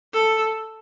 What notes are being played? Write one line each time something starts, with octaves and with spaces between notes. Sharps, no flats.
A4